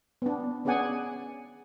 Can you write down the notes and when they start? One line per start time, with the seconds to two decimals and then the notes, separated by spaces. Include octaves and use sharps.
0.22 B3 D4
0.65 B3 C#4 G#4 D5 F#5 G#5